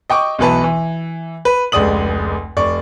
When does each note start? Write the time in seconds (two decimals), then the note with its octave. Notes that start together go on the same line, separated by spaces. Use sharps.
0.10 D#5 G5 C#6 D6
0.39 B1 B2 E3 B4 A5
0.64 E3
1.45 B4
1.72 F1 C#2 G#3 D5 D#6 F#7
2.57 F1 D5 C#6